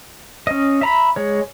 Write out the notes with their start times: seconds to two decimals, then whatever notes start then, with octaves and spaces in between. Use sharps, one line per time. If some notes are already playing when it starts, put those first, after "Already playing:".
0.47 C#4 D#5
0.81 E5 A#5 B5
1.16 G#3 C#5